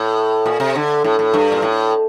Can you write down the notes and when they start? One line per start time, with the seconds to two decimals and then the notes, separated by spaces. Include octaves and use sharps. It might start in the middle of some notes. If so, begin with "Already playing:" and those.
Already playing: A2
0.46 A#2
0.60 C3
0.75 D3
1.04 A2
1.19 A2
1.34 G2
1.52 A#2
1.62 A2